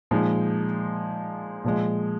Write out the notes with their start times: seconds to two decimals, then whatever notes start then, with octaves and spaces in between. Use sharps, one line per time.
0.11 A#2 F3 G#3 D#4
1.64 A#2 F3 G#3